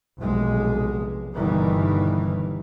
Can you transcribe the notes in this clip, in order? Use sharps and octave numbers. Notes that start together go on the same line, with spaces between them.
F1 B1 A#2 G#3
G1 G2 B2 D#3 E3 G3